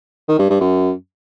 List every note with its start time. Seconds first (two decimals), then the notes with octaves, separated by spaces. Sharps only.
0.28 D#3
0.39 G2
0.50 G2
0.61 F#2